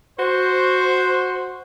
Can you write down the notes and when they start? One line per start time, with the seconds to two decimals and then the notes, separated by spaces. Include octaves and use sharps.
0.19 F#4 C5